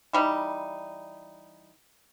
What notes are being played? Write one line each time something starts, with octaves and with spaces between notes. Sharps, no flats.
E3 G3 D#4